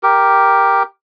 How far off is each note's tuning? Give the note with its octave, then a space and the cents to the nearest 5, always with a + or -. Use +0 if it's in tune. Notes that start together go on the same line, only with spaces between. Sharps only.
G4 +0 A#4 +0